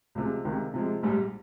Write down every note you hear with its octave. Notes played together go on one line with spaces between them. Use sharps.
C#2 C3 F3 G#3
C#2 C3 D#3
C3 F3 G#3
A#1 G#2 G3